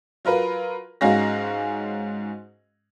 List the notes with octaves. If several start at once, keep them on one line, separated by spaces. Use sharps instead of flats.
F#3 F4 A#4 B4
G#2 G#3 C#4 F#4 F5 A#6